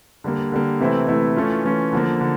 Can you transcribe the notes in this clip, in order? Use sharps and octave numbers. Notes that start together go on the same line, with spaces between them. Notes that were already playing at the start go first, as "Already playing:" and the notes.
D3 G3 A#3
D3 G3 A#3
C3 E3 A3 C4 E4
C3 E3 A3 C4 E4
E3 A3 C#4 F4
E3 A3 C#4 F4
D3 F3 A#3
D3